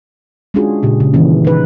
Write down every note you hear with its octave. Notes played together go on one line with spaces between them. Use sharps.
G#3 C#4 D4 F4 F#4 G#4
A#2 C#3 G4
C#3
D#3 E3 G3 A#3 C#4
D#4 B4